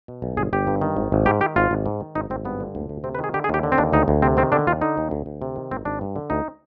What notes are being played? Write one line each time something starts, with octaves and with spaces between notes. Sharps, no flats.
B2
B1
G1 G#4
G1 G4
G2
D#3
G#1
G#1
G#2 G4
D#3 G4
G#1 F4
G#1
G#2
D#3
G#1 D#4
G#1 C4
G2 B3
D3
D2
D2
C3 C4
B4
D#3
G#4
D3 G4
G#4
D#2 G4
D3
C4
D#2 D4
D2 D#4
D2
C3 C4
D#3 C4
D3 D4
D#2 F4
D3 D#4
D#2
D2
D2
C3
D#3
G#1 C4
G#1 D4
G2
D3
D2 D#4